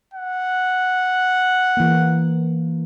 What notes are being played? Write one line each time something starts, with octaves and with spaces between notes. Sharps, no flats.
F#5
E3 A#3